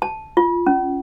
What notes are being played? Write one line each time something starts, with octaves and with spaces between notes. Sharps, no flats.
A5
F4
C#4